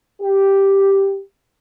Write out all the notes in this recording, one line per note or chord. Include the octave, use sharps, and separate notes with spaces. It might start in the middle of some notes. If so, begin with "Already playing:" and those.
G4